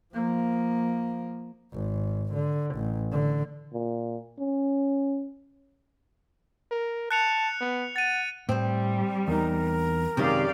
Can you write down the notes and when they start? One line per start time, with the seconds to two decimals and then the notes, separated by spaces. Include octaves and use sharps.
0.14 F3 A#3
1.73 G#1
2.34 D3
2.75 A1
3.12 D3
3.73 A#2
4.39 C#4
6.71 A#4
7.11 A5 F#6 C#7 F7
7.60 B3
7.96 F#5 A6 D#7
8.49 A2 G3 C4 C5
9.28 E2 D#4 A#4
10.17 F#2 C3 D#3 G#3 C#4 G4 D5 F5